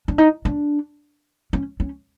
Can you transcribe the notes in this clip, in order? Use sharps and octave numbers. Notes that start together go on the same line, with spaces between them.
D4
D#4
D4
C#4
C#4